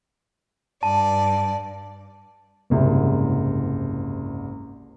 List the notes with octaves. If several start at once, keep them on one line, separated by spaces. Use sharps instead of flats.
G2 D5 A5
F#1 C2 G#2